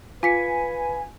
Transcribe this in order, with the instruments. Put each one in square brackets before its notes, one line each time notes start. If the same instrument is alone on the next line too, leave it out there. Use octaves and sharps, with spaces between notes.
[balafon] F4 [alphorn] B4 [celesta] F5 B6 C#7 [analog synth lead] G#5